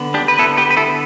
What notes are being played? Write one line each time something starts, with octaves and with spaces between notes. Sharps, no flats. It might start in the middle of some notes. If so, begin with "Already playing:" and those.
Already playing: D3 B3
D4 G4
B4
D3 B3 E4 A4
G4 B4
B4
E4 A4